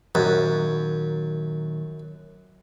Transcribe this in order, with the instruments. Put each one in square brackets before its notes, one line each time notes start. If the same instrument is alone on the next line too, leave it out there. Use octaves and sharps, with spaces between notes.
[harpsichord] F#2 [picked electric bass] A#2 D#3 F#3